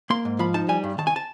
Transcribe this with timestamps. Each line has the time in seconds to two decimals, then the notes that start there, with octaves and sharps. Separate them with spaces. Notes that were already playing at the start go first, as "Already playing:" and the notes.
0.10 A#3 C6
0.25 G#2
0.39 F3 B5
0.54 D#4 A5
0.69 G3 G#5
0.84 G2
0.98 D#3 A5
1.07 G#5
1.16 A5